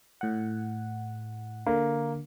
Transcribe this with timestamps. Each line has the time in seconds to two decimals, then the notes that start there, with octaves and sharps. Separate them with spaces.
0.21 A2 F#5
1.66 D3 A#3